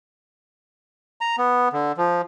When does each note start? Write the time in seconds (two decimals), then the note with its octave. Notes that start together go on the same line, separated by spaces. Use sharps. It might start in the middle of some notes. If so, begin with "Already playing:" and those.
1.21 A#5
1.38 B3
1.73 D3
1.98 F3